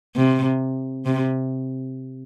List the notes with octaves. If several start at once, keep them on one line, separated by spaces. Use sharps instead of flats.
C3
C3